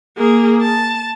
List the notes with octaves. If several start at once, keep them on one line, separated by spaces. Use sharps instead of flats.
A#3 G#4
A5